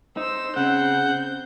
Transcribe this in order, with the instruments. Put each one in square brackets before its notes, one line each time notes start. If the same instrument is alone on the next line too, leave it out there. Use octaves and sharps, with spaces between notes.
[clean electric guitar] D#4 [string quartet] C5 E6
[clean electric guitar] C#3 [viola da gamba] C4 [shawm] F#5 [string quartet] G6